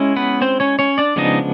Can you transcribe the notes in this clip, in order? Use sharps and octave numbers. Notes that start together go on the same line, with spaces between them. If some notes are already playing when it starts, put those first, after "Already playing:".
Already playing: G#3 C#4 E4
B3 B4
C4 C5
C#4 C#5
C#4 C#5
D4 D5
C#3 F3 G#3 B3 D4 D#4 D#5